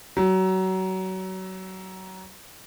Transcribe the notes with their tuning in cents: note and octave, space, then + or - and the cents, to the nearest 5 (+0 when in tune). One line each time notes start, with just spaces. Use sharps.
F#3 +25